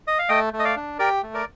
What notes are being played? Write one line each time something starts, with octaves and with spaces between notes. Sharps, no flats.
D#5
F5
A3 D#5 G5
A3
D#5
D5 F5
D4
G4 A#4 D5
A3
A#4 D5